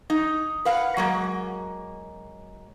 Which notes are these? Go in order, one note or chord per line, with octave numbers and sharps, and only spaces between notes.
D#4
B4 F5 F#5
F#3 G#3 A#3